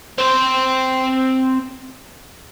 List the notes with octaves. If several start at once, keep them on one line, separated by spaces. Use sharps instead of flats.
C4 C5